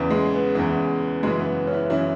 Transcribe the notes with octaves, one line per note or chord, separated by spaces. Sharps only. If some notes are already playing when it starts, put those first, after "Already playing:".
Already playing: E2 C#3 E3
G#3
B3
E2 C#3 E3
F#2 C#3 E3 G#3
B3
C#4
E4
F#2 C#3 E3 E4